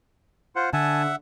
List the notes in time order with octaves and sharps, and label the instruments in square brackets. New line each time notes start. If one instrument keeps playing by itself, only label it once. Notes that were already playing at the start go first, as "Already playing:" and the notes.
[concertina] F4 C5 F#5
[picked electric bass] D3 [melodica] E5 F#5 [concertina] G#5 A5